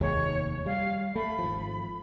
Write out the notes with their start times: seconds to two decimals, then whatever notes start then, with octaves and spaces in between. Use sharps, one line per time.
0.01 F1 D#2 G#3 C#5
0.66 G3 F5
1.15 A3 B5
1.39 G#1 F3